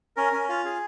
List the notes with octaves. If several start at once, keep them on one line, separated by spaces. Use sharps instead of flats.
C#4 A#4
C#4
F4
G#4